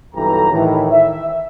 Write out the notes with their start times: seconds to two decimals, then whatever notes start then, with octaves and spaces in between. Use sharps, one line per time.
0.15 B1 G2 E3 G4 A4 A#5
0.51 A2 D#3 E3
0.91 E5